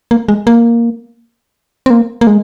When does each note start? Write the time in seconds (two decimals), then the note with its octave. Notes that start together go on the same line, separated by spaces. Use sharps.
0.11 A#3
0.28 G#3
0.47 A#3
1.86 C4
1.90 A#3
2.21 A#3
2.27 G#3